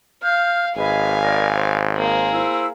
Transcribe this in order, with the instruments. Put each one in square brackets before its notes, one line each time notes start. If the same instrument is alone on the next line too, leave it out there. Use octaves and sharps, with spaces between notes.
[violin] F5 [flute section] F6 G6
[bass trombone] G#1 [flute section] G#4 B4 D#5 [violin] F5 G#5
[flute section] A#4 D5
C5
[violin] A#3 G#4
[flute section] E4 C5 E6